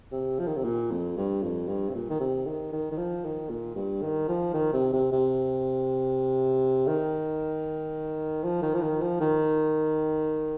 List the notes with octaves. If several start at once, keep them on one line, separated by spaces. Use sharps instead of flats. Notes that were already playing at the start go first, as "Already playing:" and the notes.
C3
F3
D#3
C3
A#2
F2
G2
F2
G2
C3
A#2
D#3
C3
D#3
D#3
D#3
F3
D#3
A#2
G2
D#3
F3
D#3
C3
C3
C3
D#3
F3
D#3
F3
D#3
F3
D#3